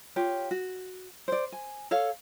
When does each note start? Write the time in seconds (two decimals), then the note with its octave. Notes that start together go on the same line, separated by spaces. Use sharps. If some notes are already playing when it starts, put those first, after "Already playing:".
0.16 F4 G4 C#5
0.51 F#4
1.28 C5 D5
1.52 G#5
1.91 A4 C#5 F5